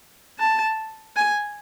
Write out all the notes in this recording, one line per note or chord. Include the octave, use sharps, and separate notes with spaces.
A5
G#5